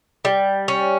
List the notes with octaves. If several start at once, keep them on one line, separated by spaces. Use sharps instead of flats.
G3
C#4